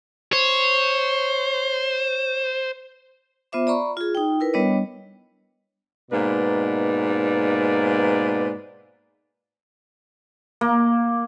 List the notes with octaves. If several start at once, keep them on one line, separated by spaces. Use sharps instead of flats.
C5 C#5
B3 F4 C5 E5 D6
D5 A#5 B5 C#6
F4 G#4
D#4 G5
E4 A#4 B4
G3 B3 D4 C#5 D#5
G#2 B2 A#3 B4 D5
A#3